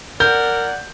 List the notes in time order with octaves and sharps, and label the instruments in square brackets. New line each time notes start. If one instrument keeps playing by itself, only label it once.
[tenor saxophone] A#4 [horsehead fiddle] D5 F#5 [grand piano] G6